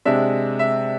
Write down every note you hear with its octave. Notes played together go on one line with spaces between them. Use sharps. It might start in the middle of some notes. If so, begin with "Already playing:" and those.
C3 G#3 D4 E5
E5